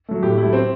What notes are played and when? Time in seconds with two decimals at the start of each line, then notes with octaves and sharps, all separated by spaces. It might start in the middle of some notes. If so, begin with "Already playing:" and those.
0.09 F#3 A3
0.23 A2 G4
0.38 F#3 A3 E4
0.53 C4